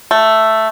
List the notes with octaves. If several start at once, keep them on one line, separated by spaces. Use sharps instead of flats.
A3